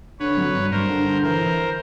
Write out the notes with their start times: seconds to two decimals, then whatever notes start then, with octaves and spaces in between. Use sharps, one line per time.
0.20 D3 B4 C#5
0.37 F#3
0.55 G2
0.71 G2 A#4 C5
0.88 D3
1.06 D3
1.23 E3 A#4 C5
1.40 E3